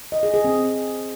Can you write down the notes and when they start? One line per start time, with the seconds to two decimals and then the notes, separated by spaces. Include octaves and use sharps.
0.12 D#5
0.23 G#4
0.34 G#4
0.45 C4